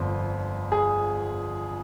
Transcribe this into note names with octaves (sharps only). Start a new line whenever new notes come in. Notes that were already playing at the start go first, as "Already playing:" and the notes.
Already playing: G1 F2 D3 C5
G#4